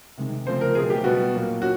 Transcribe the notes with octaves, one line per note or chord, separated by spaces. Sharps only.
C3 D#3 G#3
C#3 F3 A3 C4 C5
A#4
B2 F#3 A3 C4 G#4
G4
B2 G3 B3 F#4
A#2 F#3 A#3
C#4 F#4